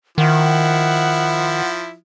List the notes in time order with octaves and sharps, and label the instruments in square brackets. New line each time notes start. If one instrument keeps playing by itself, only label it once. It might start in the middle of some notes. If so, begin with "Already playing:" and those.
[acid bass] D#3 [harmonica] F3 E4 [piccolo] F#5